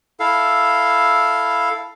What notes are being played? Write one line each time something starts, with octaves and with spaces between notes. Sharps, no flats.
E4 A4 F5